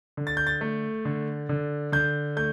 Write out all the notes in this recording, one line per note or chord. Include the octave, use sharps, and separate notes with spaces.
D3
A6
G6
A6
A3
D3
D3
D3 G6
A3 G6